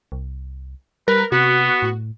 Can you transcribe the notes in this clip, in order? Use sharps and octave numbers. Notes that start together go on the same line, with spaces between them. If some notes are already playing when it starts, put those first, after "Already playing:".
C2
G3 A#4 B4
C3 B3 F#4
A2